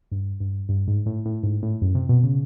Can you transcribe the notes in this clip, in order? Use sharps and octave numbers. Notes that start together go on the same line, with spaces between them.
G2
G2
G2
G#2
A2
A2
G#2
A2
F#2
C3
B2
C#3